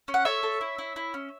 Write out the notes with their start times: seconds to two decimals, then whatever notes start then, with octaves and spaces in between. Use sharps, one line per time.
0.08 C#4
0.14 F#5
0.25 A4 C#5 E5
0.43 A4
0.61 E4
0.78 E4
0.96 E4
1.14 C#4